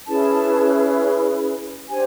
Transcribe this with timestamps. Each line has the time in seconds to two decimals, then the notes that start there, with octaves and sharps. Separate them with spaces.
0.07 C#4 E4 G#4 B4 A5
1.89 D4 G4 C5 G#5